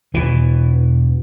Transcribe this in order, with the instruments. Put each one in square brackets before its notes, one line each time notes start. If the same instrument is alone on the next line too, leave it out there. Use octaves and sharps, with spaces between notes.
[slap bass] E2 B2 E3